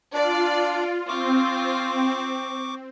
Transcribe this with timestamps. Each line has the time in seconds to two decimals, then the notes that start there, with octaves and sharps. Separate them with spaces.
0.13 D4 F4 D5
1.09 C4 F4 C#6 D6